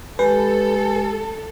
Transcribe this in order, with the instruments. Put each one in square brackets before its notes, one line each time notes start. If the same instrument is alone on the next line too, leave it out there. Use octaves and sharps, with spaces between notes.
[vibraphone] G#3 G4 G#5 [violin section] A4 [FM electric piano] B4